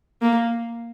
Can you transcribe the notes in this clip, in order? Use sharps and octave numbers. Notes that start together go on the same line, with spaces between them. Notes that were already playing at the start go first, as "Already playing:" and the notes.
A#3